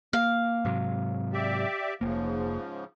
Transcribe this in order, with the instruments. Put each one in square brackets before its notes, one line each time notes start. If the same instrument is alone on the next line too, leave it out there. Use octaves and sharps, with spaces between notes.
[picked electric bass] A#3 [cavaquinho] F5
[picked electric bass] G#2 C3 F#3
[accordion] G4 D5 E5
[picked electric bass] F1 A#3 [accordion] G#2 C#3 F3